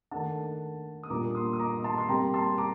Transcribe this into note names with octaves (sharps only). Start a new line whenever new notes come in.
D#3 A3 D4 F#5 A5
D#6
A#2 G3 A#3 D4 A#5 D6
C6 D#6
D#6
A#5 D6
A5 C6
C6
C3 G3 A#3 G5 A#5
A5 C6
A#5 D6